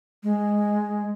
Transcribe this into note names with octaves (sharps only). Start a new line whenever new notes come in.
G#3